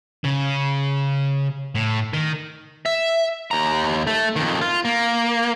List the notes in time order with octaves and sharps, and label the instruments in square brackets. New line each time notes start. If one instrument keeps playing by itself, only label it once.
[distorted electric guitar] C#3
A2
D#3
[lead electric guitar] E5
D#2 A#5
A3
F2 D#3
F4
A#3